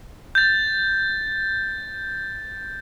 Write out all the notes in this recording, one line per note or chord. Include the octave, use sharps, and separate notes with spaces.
G6 A6